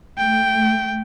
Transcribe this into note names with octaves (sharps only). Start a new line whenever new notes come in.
A3 G5